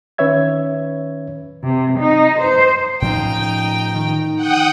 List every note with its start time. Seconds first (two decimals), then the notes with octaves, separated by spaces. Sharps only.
0.18 D#3 C#4 B4 C#5 E5 G#6
1.63 C3
1.99 D#4
2.40 C5
3.02 A2 F3 C#4 D#4 G5
3.95 D#3
4.35 F#5 G5 D#6